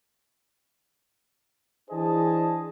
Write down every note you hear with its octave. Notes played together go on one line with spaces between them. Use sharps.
E3 D4 G#4 C5 D#5 A5